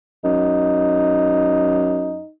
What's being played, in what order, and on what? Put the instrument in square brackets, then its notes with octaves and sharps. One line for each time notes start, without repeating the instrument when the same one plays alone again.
[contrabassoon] F#2 [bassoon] D#4